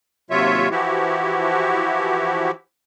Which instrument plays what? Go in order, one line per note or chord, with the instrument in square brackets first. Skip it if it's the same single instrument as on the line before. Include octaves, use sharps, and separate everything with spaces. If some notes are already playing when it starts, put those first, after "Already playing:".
[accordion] D#2 C3 F#3 F4 C#5 E5
E3 F3 E4 F#4 G4